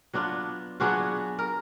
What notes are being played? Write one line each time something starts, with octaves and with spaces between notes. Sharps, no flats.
F#3 B3 D4 F4
F#3 B3 D4 F4 F#4 G#4
A#4